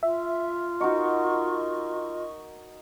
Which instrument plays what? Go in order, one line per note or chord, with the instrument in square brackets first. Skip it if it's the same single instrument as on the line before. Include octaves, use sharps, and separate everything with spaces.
[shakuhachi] F4 [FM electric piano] E5
[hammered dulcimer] D#4 F#4 A#4 [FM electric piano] D#5 C#6